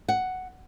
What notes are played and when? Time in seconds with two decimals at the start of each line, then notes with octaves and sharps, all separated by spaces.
0.08 F#5